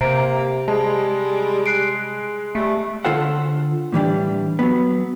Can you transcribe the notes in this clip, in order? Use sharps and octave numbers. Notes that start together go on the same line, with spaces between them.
C3 A#3 C5 A#5 D7
G3 G#3 A5
F#6 C7 D7
G3 A3
D3 F4 A4 C5 F#5
A2 E3 G3 D4
F#3 B3